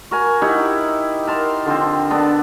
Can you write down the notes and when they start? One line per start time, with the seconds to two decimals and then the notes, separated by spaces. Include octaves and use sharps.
0.11 F#4 A#4 G#5
0.42 D#4 E4 G4 F#5
1.27 A#4 A5 C6
1.66 D3 F3 C4
2.11 B3 D4 A4